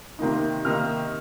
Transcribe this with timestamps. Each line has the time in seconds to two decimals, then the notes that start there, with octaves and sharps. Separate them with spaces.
0.19 C3 D#3 A#3 D#4
0.65 C3 D#3 A#3 D#4 F6